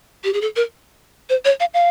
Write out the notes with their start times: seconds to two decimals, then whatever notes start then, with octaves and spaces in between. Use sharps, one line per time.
0.24 G4
0.33 G#4
0.41 A4
0.56 A#4
1.29 C5
1.45 C#5
1.60 F5
1.74 F5